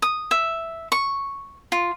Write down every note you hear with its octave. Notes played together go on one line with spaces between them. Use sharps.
D#6
E5
C#6
F4